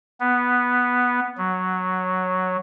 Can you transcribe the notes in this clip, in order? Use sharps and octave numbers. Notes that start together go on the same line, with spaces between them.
B3
F#3